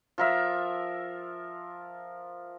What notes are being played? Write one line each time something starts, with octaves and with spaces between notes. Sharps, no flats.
F3 A#4 E5